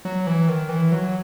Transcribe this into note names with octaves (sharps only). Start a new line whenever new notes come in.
F#3
E3
D#3
E3
F#3